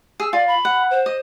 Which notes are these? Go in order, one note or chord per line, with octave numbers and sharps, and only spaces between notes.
G#4 E6
F4 D5
B5
F#5
C5
D#5